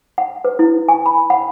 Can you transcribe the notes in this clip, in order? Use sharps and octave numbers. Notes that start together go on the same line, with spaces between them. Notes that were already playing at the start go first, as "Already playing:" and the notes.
F#5
B4
E4
G#5
B5
F#5